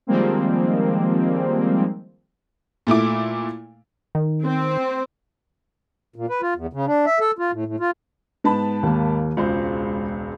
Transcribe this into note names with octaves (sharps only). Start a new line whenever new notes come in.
D#3 F3 G3 G#3 A#3 C4
A#2 A3 E4 D6
D#3
C4
A#2
B4
F4
E2
C#3
D4
E5
A4
F4
A2
A2
F4
G#2 B3 A5 B5
D#2 A#3
E1 C#2 F4 C5